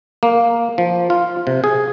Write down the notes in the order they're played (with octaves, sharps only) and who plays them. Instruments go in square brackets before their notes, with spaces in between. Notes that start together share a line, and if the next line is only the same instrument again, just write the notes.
[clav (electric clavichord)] A#3
F3
F4
C3
G#4